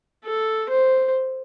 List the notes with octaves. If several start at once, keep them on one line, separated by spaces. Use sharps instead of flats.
A4
C5